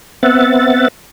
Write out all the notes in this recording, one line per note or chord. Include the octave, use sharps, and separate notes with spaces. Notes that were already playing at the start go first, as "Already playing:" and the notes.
B3 C4 E5 F#5 A6